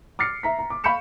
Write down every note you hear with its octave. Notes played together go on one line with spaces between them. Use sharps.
D6 F6 A6 C7 C#7
E5 A#5 B6
A#5
D6
F5 B5 C#6 G6 C#7 E7